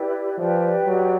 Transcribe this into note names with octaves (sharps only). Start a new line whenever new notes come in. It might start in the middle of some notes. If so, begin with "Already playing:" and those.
Already playing: E4 G4 B4 D5
F3 G4 B4 D5 G5
F#3